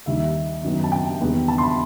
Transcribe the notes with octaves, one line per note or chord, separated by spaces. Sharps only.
D#2 D#3 G3 E5
F#2 D#3 F#3 B3
A5
G5
E2 D#3 G3 B3 D#4
A5
C6
B5